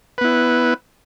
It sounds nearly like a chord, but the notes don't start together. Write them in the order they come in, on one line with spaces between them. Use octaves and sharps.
B4 B3 E4